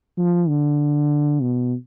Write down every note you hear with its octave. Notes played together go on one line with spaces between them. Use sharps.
F3
D3
B2